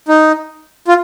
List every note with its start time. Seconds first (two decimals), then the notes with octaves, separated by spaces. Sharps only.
0.08 D#4
0.88 F4